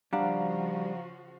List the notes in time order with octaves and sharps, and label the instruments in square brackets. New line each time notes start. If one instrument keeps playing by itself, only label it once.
[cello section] C#3 F3 F#4 [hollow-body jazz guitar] G3 D4 [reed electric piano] F5 F#5 A#5